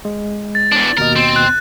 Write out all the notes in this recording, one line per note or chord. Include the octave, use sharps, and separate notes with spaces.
G#3
A6
E2 D4
D#2 B2 A#4 D#5
C4
F#6